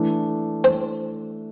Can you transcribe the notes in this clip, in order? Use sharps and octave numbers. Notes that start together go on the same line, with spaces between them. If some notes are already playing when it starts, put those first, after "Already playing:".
Already playing: E3 A3 D4
C4